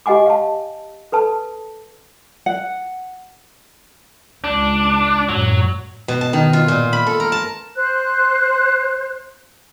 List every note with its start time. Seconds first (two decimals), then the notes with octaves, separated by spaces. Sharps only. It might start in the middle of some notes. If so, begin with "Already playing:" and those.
0.06 G4 D#5 F#5 G#5 D6
0.26 F5 A5
1.12 A4 B4 A5
2.46 F#5
4.44 C#2 D4
5.29 F#2 A2 F#3
6.08 B2
6.21 A5
6.33 D#3
6.53 F4
6.68 A#2
6.93 B5
7.07 A4
7.20 A#4
7.32 A5
7.76 C5 F#6